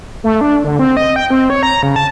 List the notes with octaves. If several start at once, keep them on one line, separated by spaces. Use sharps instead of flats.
A3
D4
D3
C4
D#5
G5
C4
C#5
A#5
C#3
A5